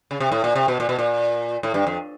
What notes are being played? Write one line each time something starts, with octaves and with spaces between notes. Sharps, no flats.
C#3
C3
A2
A#2
C3
B2
A#2
B2
A#2
A2
G2
F2